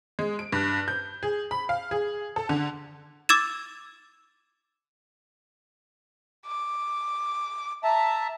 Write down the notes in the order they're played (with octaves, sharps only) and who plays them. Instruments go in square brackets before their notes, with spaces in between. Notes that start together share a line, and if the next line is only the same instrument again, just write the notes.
[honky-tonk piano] G#3
D7
G2
G6
G#4
B5
F5
G#4
A4
D3
[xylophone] D6 E6 G#6 A6 E7
[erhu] D6
[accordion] E5 A5 [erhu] A#5